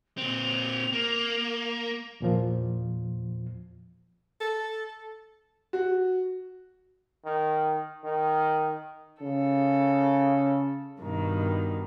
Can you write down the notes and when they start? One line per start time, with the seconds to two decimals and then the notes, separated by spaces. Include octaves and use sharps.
0.17 A#2 C4 F7
0.93 A#3
2.20 E2 A#2 F3
4.40 A4
5.73 F#4
7.25 D#3
8.05 D#3
9.22 C#3 A4
11.00 G2 B2 D#3